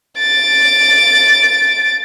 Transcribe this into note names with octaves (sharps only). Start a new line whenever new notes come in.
A6 D7